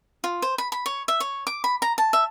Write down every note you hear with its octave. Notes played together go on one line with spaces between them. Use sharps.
F4
C5
B5
B5
C#5
E5
C#5
D6
B5
A#5
A5
E5